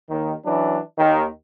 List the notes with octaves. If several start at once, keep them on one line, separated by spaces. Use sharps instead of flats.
D#2 D#3
E3 F#3 C#4 D4
D#2 D#3